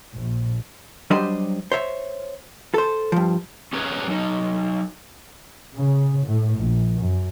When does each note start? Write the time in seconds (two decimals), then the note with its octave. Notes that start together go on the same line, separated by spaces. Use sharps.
0.14 A#1
1.10 F#3 G3 D4 G4 C5 D#5
1.72 C5 C#5 E5
2.74 A4 C5
3.12 G2 F3
3.73 C#4 G#4 A#4 B4 C#5
4.08 F#3 D#4
5.75 C#3
6.26 A2
6.59 A#1
7.00 F#2